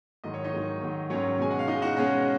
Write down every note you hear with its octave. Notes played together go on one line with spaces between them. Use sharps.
G#2 D#3 F#3 D#5
C#5
D#4 D#5
G#2 D#3 F#3
G#2 D#3 F#3
G#2 D#3 F#3 C#4 C#5
B2 G#3 G#5
F#5
F5
B2 G#3 D#4 D#5
F#4 F#5
B2 G#3 C#4 C#5